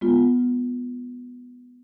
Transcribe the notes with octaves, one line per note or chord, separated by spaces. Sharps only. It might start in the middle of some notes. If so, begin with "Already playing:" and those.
G#3 B3 F4